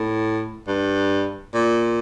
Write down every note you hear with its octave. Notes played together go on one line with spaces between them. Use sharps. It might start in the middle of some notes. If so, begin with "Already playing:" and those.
Already playing: A2
G2
A#2